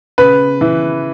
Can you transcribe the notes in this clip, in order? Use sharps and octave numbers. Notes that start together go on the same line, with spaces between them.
C#3 B4
E3